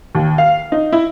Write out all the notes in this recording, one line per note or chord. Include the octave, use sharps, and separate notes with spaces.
D#2
F5
D#4
E4